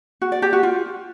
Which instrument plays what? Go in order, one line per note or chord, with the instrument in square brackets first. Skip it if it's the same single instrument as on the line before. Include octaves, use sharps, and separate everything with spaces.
[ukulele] F#4
D5
G4
F#4
F4